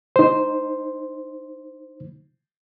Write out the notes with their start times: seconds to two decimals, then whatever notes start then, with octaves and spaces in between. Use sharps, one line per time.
0.16 D#4 C5